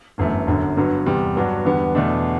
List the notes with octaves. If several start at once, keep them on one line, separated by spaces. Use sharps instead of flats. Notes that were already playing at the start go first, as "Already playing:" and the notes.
G1 F#2 E3 A3
G1 F#2 D3
G2 D3 F#3 B3
E2 C3 G3
G2 F#3 B3 D4 F#4
E2 D3 G3 B3
E2 B2 A3 D4